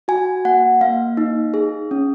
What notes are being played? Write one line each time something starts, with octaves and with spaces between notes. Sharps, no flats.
F#4 G#5
A#3 F#5
A#3 F5
D#4
G#4
C#4